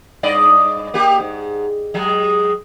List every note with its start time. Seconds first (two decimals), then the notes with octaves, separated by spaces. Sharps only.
0.23 G2 D5 D#5
0.94 A#3 G4
1.20 G#2
1.94 F#3 G#3